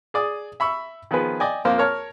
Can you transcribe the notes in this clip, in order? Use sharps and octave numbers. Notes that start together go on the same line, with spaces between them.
G#4 D5 D#6
E5 B5 C#6 E6
D#3 F3 B3 G#4 B4
D5 D#5 G5 G#5
F2 A#3 C5 F5
A#4 C#5 A5 F6